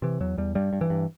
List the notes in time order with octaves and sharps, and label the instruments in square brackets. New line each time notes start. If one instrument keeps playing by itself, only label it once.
[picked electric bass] C3 E3
E2 F#3
E2 G3
G2 G3
G2
E3
G2